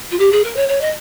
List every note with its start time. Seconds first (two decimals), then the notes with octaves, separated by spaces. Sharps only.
0.11 F4
0.19 G4
0.32 G#4
0.44 A#4
0.56 C#5
0.68 C#5
0.81 D#5